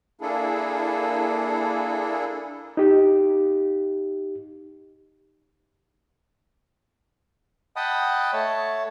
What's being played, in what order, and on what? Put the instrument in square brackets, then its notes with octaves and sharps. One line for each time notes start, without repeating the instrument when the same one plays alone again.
[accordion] A#3 D4 E4 G#4 A4
[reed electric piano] D#4 G4
[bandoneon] D#5 F#5 G5 A5 B5 D#6
A3 C#5 A5